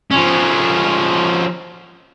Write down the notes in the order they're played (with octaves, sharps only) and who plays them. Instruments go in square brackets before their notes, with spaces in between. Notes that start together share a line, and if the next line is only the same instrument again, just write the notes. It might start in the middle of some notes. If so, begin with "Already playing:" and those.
[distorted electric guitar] F3 C#4